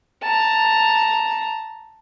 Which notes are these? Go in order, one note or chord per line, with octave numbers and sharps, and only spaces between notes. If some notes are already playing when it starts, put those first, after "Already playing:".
A5 A#5